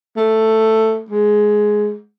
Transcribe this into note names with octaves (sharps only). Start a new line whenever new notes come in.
A3
G#3